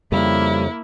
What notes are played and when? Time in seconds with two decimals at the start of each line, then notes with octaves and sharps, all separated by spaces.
0.12 F2 C#3 G3 A#3 E4